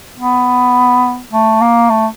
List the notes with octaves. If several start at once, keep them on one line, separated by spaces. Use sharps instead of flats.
B3
A3
A#3
A3